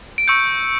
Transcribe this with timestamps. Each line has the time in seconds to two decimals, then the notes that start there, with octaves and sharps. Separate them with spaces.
0.18 D7
0.28 C#6 E6 G6 C#7